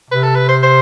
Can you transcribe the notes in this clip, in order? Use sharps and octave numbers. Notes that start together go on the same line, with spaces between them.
C3 B4
A4
B4
C5
C5